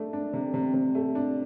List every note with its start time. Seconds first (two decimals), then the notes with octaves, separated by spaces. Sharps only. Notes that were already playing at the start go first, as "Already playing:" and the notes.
Already playing: A3 D4
0.13 D4
0.33 C3
0.54 C3
0.74 C3
0.95 A3
1.15 D4